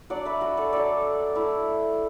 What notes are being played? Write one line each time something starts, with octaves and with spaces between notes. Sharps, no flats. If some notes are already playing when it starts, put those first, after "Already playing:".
F#3 D4 D5 F#5
B4 E5
F#4 B4
A4 D5
F#3 D4 A4 D5
A3 E4